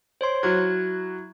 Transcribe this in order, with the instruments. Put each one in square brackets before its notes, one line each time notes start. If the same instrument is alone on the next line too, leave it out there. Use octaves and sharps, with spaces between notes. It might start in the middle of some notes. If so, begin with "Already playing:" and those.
[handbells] C5 C#5 C6
[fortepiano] F#3 [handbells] E4 F#6 G#6